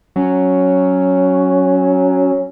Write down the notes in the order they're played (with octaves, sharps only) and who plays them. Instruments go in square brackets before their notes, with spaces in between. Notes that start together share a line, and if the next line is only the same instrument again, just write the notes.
[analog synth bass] F#3 [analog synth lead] C#4